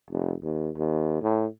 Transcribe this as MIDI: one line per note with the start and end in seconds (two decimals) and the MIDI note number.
0.10 0.35 29
0.43 0.70 39
0.77 1.18 39
1.22 1.46 45